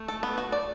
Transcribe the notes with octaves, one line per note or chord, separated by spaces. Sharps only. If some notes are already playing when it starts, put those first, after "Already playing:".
Already playing: A3
A4
B3
F#4
D5